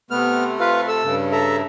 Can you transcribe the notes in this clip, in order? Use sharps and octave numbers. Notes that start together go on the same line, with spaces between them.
C3 A3 B3 F6
F4 B4 F5
A4 E6
G2 C#3
A4 E5 A#5